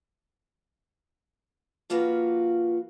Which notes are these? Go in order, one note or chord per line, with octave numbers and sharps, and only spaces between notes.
F3 A#3 F4 F#4 B4